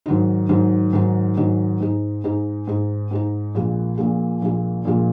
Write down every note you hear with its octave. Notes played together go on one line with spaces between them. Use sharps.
G#2 D#3 F#3 D#4
G#2 D#3 F#3 D#4
G#2 D#3 F#3 D#4
G#2 D#3 F#3 D#4
G#2 G#3 D#4
G#2 G#3 D#4
G#2 G#3 D#4
G#2 G#3 D#4
A#1 A#2 G#3
A#1 A#2 G#3
A#1 A#2 G#3
A#1 A#2 G#3